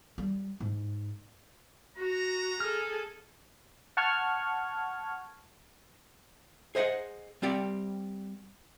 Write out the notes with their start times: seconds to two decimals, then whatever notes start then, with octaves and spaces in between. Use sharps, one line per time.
0.18 G3
0.60 G#2
1.97 F#4 A#5
2.60 G#4 A4 F6
3.97 F#5 A5 C#6 F6 G#6
6.75 G#4 C5 D#5 F5 F#5
7.42 G3 C4 G4 D5